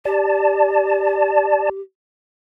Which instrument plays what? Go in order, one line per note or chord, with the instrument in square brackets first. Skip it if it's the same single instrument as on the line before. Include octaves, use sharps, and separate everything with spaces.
[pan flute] G4 [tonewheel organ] D5 A5